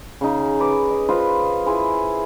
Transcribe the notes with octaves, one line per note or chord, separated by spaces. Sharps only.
C#3 D#4
B4 D6
D#5
F4 B4 C5 D#5
E4 G#4 G#5 C6